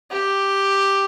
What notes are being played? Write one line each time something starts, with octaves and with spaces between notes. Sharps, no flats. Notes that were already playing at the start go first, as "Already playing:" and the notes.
G4